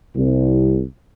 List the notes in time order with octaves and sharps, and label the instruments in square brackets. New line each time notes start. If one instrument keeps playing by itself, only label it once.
[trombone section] C2